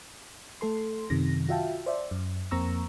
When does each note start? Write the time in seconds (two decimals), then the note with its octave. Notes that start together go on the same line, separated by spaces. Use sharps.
0.61 A3 A4 C6
1.10 F#2 C3 D#3 A#6
1.49 F4 F#4 E5 F5 G5 A5
1.86 C5 D5 E5
2.11 F#2
2.51 F2 A#3 C4 A#5 C#6 E6